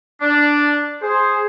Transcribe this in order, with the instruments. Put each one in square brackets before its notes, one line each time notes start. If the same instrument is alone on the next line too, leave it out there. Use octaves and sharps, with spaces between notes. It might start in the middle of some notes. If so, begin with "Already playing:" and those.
[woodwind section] D4
[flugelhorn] G#4 [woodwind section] C5